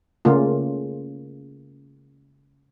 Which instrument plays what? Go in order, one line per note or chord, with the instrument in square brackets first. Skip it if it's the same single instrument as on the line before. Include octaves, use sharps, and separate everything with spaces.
[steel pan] C#3 A3 A#3 F4